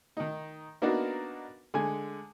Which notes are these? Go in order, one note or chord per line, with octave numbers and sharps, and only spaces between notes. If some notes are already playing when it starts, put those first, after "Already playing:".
D#3 D#4
A#3 B3 D4 D#4 F#4 A#4
D3 G#3 G#5